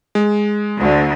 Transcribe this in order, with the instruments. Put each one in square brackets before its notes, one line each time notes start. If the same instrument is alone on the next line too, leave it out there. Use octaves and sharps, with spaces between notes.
[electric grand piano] G#3
[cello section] D2 D3